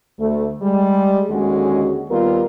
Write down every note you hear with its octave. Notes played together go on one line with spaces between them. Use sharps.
D2 A3
G3 G#3
D#2 D3 G#3 C#4 F#4
D#2 G3 B3 F4 A#4